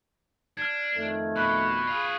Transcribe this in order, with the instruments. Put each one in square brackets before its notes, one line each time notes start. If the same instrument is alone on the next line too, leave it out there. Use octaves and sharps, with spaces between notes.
[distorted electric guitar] D4 [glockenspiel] F6 G#6
[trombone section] F2 D#3 A3
[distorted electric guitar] B2 [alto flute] B5 [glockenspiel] C#6 F#6
[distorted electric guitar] F4 G#4